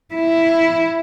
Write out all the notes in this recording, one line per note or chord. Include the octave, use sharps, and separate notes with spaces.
E4